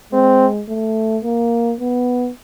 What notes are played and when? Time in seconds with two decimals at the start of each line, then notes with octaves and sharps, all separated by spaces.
0.13 G#3 C4
0.69 A3
1.24 A#3
1.80 B3